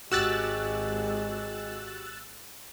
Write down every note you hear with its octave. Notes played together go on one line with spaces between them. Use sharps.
G#1 G#3 F#4 G4 E6 F#6 A6